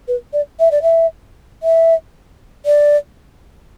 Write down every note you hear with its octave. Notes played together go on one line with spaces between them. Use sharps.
B4
D5
E5
D5
E5
E5
D5